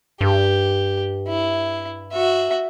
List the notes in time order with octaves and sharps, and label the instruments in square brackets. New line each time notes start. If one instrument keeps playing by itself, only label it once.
[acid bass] G2 [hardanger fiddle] G4
[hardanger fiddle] E4
F#4 E5